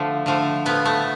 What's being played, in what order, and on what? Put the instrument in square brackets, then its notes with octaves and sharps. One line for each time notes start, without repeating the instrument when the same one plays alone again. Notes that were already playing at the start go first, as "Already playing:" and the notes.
Already playing: [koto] D3 F3 A3
D3 F3 A3
A2 F3 A3 B3
A3